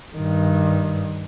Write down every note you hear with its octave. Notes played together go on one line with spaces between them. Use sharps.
G2 D#3